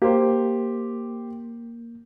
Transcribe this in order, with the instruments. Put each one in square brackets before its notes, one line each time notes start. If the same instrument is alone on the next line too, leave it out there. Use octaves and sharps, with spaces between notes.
[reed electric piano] A#3 [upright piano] G4 C5